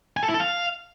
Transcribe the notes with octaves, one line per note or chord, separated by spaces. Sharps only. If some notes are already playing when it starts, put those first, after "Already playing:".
G#5
A4
E4
A4
F5